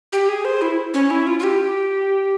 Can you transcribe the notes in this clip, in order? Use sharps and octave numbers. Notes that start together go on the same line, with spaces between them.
G4
G#4
C5
E4
C#4
E4
F4
F4
G4